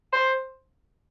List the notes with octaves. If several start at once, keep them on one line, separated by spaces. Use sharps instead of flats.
C5